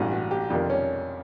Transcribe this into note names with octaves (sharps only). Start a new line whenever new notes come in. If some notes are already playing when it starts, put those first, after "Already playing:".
Already playing: A1 G2 E3 F#4
F#4
G4
F2 C3 D#3 D4
C#4